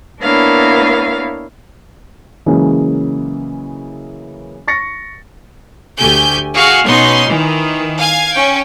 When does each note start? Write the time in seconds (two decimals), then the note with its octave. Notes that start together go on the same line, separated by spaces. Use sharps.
0.22 A#3 B3 D4 E4 C#5 F5
2.46 C#3 E3 F#3 G#3 A#3 C#4
4.67 C#6 A6 A#6 C#7
5.97 D2 A3 G4 G#5 G6
6.55 F#4 G#4 F5
6.87 B2 B3 C#4 D#4 C6
7.28 D#3 E3
7.97 F5 G#5 G#6
8.32 C#4 G5